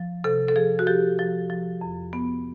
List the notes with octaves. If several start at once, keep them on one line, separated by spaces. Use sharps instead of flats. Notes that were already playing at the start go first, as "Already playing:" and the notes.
Already playing: F3
C3 A4
A4
F3 G#4
F#4
F3 G4
F3
F3
F2
B3